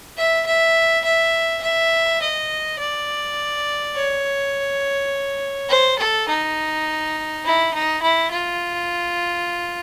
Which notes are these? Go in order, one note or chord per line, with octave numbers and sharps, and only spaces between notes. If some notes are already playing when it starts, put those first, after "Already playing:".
E5
E5
E5
E5
D#5
D5
C#5
C5
A4
D#4
E4
D#4
E4
F4